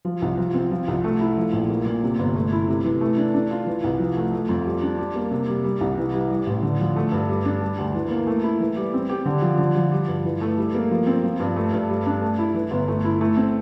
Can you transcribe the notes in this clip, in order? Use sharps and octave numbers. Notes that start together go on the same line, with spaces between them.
F3
C2
F3
C4
F3
C2
A3
E4
F3
A#1
A#3
A#2
C3
G1
A3
E4
C3
E3
A3
D4
D4
F4
E3
C2
F3
A3
A3
F2
G3
D4
G3
A#3
C3
G3
G3
C2
E3
G3
G3
A1
D3
F3
A3
G2
G3
D4
G3
D2
E3
A#3
A3
E4
E3
G3
C4
G4
D3
F3
D3
F3
G3
G2
E3
A3
G3
A#3
F3
C4
F3
G2
A3
G2
G3
D4
A3
E4
E3
G1
A3
E4
A3
C4